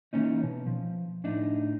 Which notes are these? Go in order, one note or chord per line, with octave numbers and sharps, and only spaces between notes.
E3 F3 A#3 C#4 D#4
B2
F3
A2 D4 D#4